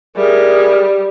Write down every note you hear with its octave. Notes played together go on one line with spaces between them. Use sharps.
G3 G#4 A#4 E5